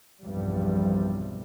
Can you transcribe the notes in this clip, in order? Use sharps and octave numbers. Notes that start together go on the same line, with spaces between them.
B1 E2 G2 C3 F3 G3